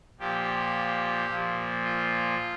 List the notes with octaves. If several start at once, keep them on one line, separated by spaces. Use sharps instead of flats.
A#2 F3 G4
A#2 F3
F4